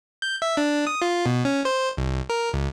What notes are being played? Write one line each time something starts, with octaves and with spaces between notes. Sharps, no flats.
G6
E5
D4
D#6
F4
B2
C#4
C5
C2
A#4
C#2